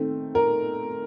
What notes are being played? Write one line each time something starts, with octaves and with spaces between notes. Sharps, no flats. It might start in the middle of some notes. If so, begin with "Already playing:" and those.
Already playing: D#3 A3 C4
A#4